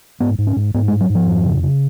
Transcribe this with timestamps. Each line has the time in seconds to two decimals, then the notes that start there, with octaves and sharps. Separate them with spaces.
0.20 G#2 B3
0.38 G#2
0.47 C#4
0.56 G#2
0.74 G#2 B3
0.88 G#3
0.93 G#2
1.01 F#3
1.10 G#2
1.15 F3
1.27 F2
1.45 C#3
1.63 C#3